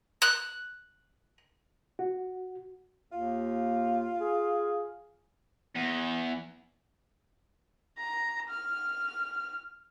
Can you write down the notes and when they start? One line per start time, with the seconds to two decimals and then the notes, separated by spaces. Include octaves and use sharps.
0.22 F#6
1.99 F#4
3.12 D#2 F4
4.20 G#4
5.75 E2
7.98 A#5
8.49 F6